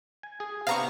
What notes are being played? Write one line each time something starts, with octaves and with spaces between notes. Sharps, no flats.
G#5
G#4
C3 B3 D4 F5 A#5 C#6